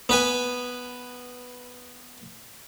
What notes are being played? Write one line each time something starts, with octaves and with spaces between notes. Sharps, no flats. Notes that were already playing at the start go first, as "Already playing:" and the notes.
B3 B4 G#5